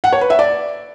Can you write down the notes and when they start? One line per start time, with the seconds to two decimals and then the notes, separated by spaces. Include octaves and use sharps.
0.04 F#5
0.12 C#5
0.21 B4
0.30 E5
0.39 D5